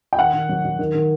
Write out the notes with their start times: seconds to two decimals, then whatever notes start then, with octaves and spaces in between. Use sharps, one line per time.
0.13 G5
0.19 D#3 F#5
0.33 D#3
0.49 F#3
0.65 F#3
0.79 D#3
0.94 D#3